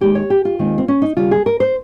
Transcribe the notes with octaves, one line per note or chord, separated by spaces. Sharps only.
D#2 D#3 G#3 G4
C#5
G4
F4
D#2 D#3 G#3 C4
C4
C#4
D#4
D#2 C#3 G3 F4
G#4
A#4
C5